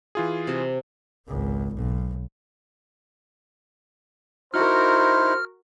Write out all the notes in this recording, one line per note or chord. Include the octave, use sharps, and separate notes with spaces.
E3 F4 G#4
C3 A5
G#1 C#2
B1
D#4 E4 F#4 A#4 C5 F6